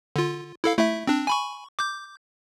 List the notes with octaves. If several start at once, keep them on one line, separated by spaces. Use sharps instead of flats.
D3 F4
E4 A4 F5
A3 E4 E5
C4 D4
G#5 B5 C#6
D6 G6